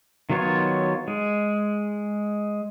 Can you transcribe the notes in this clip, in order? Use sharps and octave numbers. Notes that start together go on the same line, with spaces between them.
D#3 F#3 B3 F4 C#5
G#3